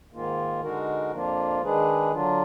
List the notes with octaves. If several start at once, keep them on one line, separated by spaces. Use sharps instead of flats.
G#2 D#3 A#3 F4
D3 G#3 D#4 F#4 A#4
F2 F3 A#3 D4 F4
D#3 G#3 D4 G#4 B4
D3 F#3 D4 F4